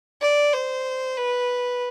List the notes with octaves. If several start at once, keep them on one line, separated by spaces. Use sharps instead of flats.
D5
C5
B4